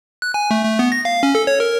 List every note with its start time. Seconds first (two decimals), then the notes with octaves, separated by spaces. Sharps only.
0.22 F#6
0.34 G#5
0.51 A3
0.65 A3
0.79 B3
0.92 A#6
1.05 F5
1.23 C#4
1.35 A4
1.47 C#5
1.60 A#4